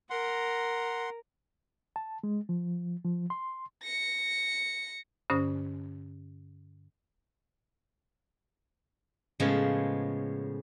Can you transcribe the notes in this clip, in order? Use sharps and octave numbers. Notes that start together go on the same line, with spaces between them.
A#4 F#5 A#5 C6
A5
G#3
F3
F3
C6
A#6 C#7
G2 D3 C#4 C5 D#6
A2 C#3 F3 G#3 B3